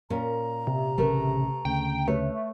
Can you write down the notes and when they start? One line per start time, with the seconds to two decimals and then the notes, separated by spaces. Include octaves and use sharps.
0.10 A#2 C#4 A#4 A#5
0.67 C3
0.98 A1 C#3 A3 A#4 B4
1.65 D2 C#3 G5
2.08 A3 B4 C#5